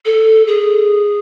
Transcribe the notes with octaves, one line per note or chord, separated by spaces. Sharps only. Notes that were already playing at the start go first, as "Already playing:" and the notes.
A4
G#4